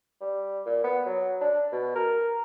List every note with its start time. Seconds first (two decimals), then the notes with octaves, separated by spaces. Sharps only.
0.21 G3
0.66 A#2
0.84 B3
1.06 F#3
1.41 D4
1.72 B2
1.95 A#4